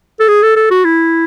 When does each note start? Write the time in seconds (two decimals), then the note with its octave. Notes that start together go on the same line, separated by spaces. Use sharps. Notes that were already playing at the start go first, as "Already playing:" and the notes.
0.20 A4
0.28 G#4
0.42 A4
0.56 A4
0.71 F#4
0.84 E4